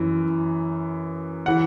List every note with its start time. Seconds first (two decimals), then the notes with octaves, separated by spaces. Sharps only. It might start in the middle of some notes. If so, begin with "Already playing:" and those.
Already playing: F#2 E3
1.46 E3 F#5